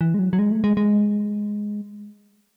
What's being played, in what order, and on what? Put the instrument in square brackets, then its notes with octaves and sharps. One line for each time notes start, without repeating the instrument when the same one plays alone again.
[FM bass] E3
G#3
F#3
F#3
G#3
A3
G#3
G#3